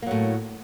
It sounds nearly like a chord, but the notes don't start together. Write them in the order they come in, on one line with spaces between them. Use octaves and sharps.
A#3 F#3 A2